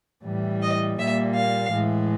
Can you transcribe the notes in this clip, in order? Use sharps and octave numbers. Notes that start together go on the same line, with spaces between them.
A2 E3 G3
D#5
A#2 G3 A#3 E5
F5
A2 E3 G#3